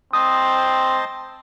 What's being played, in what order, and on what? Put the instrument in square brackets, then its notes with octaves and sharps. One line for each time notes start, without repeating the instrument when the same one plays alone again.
[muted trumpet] C4 [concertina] C5 D#5 A5 [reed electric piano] D#6